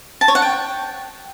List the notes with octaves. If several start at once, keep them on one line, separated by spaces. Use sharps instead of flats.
A5
C#5
F#5
G5